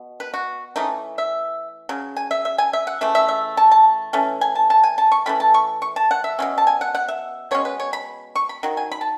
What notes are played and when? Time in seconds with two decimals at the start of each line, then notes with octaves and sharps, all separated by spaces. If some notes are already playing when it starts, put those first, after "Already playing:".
Already playing: B2
0.20 B4
0.34 F#4
0.76 E3 A3 C#4 D#4
1.18 E5
1.89 C#3 F#3
2.16 G#5
2.31 E5
2.45 E5
2.58 G#5
2.73 E5
2.87 F#5
3.01 C#3 E3 A3 E5
3.15 E5
3.29 E5
3.57 A5
3.71 A5
4.13 E3 A3 C#4
4.41 G#5
4.55 A5
4.70 A5
4.83 G#5
4.98 A5
5.12 C#6
5.26 E3 A3 C#4 B5
5.40 A5
5.54 C#6
5.82 C#6
5.96 A5
6.11 F#5
6.24 E5
6.39 B2 F#3 C#4
6.58 A5
6.67 G#5
6.81 F#5
6.95 F#5
7.08 E5
7.51 B2 G#3 C#4 C#5
7.65 B4
7.80 C#5
7.93 B5
8.36 C#6
8.49 B5
8.63 D#3 F#3
8.77 G#5
8.92 B5
9.01 A5